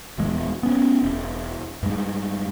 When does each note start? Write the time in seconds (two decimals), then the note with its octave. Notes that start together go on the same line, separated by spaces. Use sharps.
0.18 D#1 E2 G#3
0.63 B3 C#4
1.03 E1
1.83 G2 G#3